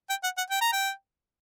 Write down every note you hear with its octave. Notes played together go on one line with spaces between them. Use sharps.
G5
F#5
F#5
G5
A#5
G5